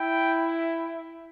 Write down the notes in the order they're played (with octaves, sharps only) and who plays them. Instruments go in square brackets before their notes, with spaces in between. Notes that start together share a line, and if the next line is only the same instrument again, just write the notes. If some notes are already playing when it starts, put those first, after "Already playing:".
Already playing: [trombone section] E4 [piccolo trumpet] G5